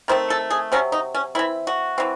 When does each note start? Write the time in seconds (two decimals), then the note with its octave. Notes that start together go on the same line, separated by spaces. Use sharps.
0.08 D#3 A3 C4 C5
0.30 A4
0.50 G#4
0.72 C3 F#3 C4 C#4
0.92 D#4
1.15 C#4
1.35 E3 C4 E4
1.67 F#4
1.98 E3 C4